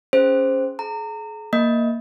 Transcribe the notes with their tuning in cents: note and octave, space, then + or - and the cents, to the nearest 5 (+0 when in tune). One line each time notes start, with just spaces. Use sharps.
C#4 +0 G#4 +0 C5 +0
G#4 +40 A#5 -30
A#3 +0 D#5 +0